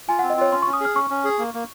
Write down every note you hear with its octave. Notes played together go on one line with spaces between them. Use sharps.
F4 G#5
C4 F#5
D#5
F4 C#5
C#4 C6
C#4 C#6
D#6
G#4 F6
C#4 C#6
C#4
G#4
A#3
A#3